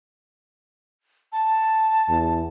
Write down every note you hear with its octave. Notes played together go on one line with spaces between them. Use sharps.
A5
E2